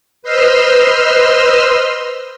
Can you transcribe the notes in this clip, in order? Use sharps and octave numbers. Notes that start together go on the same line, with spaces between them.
B4 C5 D#5 C6 E6 F6